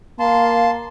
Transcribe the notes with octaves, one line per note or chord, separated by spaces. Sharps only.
A#3 F5 A5 C6